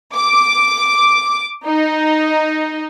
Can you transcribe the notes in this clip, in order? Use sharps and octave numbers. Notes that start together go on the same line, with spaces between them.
D6
D#4